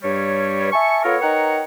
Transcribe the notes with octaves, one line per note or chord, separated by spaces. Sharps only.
G2 G3 C#5
E5 G#5 A5 C#6
B3 F4 A4 A#4 C#5
D#4 A#4 B4 C#5 F#5 G5